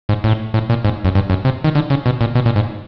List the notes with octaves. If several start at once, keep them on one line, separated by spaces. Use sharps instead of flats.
G#2
A2
A2
A#2
G#2
F#2
G2
F#2
C3
D#3
D3
C#3
B2
A#2
B2
A#2
G#2